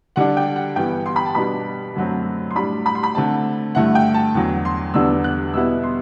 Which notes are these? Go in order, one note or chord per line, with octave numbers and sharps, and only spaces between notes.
D3 G3 D4 F#5
G5
F#5
G2 E3 G3 B3 G5
C6
B5
A5
B2 G3 B3 D4 B5
F#2 D3 F#3 A3 C4
C6
A2 G3 D4 B5
B5
C6
B5
D3 A3 C4 A5
G2 D3 A3 E4 F#5
G5
A5
E2 D3 F#3
C6
E2 D3 G3 B3 D4 E6
F#6
B2 G3 B3 E4 E6
C6